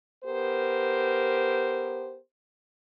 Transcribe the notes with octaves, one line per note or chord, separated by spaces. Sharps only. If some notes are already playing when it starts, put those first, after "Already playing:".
B3 G4 A#4 C5